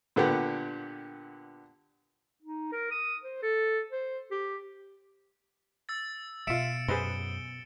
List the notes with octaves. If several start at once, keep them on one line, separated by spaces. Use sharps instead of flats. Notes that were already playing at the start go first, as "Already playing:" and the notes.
A#2 D3 B3 G4
D#4
A#4
D#6
C5
A4
C5
G4
E6 A6
B2 F4 E5 C#7 D7 E7
F#2 G#4 B4 C5 G7